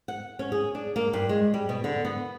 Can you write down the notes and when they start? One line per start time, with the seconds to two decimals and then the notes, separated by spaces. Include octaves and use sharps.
0.08 F#5
0.39 C#4
0.52 G#4
0.75 D4
0.96 A#3
1.13 G2
1.29 G#3
1.54 G3
1.69 B2
1.84 D3
2.05 B3